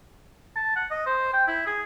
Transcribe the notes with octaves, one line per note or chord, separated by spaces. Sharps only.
A5
F#5
D#5
C5
G5
E4
G#4